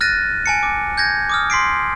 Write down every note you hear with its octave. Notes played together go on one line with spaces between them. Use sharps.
F6 F#6 A6 A#6 D#7
G#5 A5 C#7
D6
G6 G#6 A#6
D6 D#6 F6
C6 B6 C7 D7